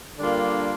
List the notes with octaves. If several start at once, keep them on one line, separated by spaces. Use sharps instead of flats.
D3 G3 A#3 D4 F4